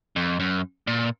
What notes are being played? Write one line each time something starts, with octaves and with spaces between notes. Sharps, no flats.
F2
F#2
A#2